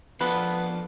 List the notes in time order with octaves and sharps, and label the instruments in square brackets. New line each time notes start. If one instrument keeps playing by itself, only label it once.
[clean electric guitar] F3 D4 A4 [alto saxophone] B3 [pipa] B4